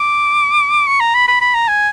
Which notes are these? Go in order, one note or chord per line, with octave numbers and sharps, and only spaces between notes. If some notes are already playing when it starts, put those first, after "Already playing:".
Already playing: D6
C#6
A#5
B5
B5
B5
A#5
G#5